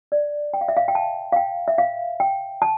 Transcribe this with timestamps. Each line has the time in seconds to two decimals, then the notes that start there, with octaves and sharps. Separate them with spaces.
0.12 D5
0.54 G5
0.61 F5
0.68 E5
0.77 F5
0.88 G5
0.95 A5
1.32 F5
1.36 G5
1.68 E5
1.78 F5
2.20 G5
2.62 A5